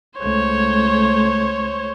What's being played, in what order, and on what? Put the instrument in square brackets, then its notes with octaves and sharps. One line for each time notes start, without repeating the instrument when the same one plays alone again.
[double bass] C#2 A3 [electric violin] C5 C#5